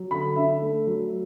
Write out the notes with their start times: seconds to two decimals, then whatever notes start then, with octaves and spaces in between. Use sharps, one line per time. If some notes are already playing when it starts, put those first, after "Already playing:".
Already playing: F#3
0.11 D3 B5
0.36 D4 E5
0.62 A3
0.87 F#3